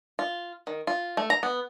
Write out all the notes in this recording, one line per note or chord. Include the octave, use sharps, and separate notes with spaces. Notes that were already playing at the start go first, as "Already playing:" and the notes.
F4
D#3
F4
A3
A#5
B3